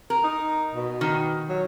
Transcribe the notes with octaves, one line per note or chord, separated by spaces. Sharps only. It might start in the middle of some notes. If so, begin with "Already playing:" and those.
A#4
D#4
B2
D#3
F#3